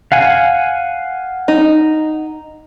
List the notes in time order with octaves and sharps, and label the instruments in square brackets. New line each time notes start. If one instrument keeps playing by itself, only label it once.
[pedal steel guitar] F5 F#5 G#5
[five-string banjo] D#4